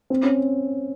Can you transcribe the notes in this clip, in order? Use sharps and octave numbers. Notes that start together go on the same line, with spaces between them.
C4
C#4